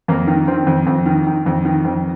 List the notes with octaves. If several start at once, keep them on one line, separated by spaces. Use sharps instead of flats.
F2 A#3
D#3
D#3 C4
F2
F2
D#3
D#3
F2
D#3
F2